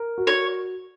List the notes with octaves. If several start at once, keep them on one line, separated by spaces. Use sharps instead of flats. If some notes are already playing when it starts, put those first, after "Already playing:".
Already playing: A#4
F#4
C#5